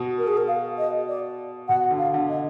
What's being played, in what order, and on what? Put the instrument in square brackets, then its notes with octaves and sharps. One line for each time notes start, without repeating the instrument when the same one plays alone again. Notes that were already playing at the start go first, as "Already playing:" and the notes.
Already playing: [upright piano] B2
[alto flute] A#4
G#4
A#4
F5
D#5
D5
[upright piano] B2 [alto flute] F#5
[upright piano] D3
[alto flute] F5
[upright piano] D3
[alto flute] D#5